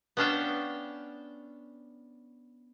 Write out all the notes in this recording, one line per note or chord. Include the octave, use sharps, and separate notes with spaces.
B3 C#4 D4 F5 G5 A5